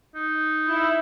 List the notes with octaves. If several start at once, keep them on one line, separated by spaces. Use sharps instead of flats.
D#4
E4